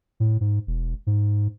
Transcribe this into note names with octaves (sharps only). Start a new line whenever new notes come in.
A2
G#2
E1
G#2